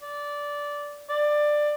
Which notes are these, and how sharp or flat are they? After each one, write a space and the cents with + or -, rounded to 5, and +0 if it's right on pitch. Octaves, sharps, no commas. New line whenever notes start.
D5 -15
D5 +15